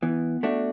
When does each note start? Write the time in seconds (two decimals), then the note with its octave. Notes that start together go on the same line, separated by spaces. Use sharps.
0.02 E3 B3
0.43 A3 D4 F#4